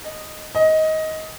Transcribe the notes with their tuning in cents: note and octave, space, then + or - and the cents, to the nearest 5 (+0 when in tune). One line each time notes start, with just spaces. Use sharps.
D#5 -10
D#5 +15